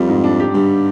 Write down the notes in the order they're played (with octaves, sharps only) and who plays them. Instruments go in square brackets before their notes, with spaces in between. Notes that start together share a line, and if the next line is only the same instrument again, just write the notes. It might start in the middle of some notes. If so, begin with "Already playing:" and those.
Already playing: [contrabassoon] F2 [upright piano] G3
[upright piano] G#2
D4
G4
[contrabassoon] G2 [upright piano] G3